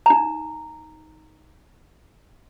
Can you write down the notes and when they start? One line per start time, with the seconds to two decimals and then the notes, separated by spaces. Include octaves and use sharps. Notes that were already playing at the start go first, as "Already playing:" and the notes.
0.06 D#4 A#5